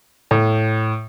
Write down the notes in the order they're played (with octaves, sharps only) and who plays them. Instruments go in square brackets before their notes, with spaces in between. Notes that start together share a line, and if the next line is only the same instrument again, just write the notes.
[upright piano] A2